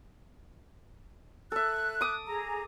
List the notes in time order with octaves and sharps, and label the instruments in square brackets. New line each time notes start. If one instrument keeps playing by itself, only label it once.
[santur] A4 E5 [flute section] F#6
[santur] D6 D#6
[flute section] G#4 A#5